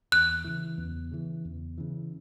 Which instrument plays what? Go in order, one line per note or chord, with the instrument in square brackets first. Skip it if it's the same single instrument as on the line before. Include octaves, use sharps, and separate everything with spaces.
[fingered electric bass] E2 [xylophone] F#6
[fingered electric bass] C#3 E3
E2
C#3 E3
E2
C#3 E3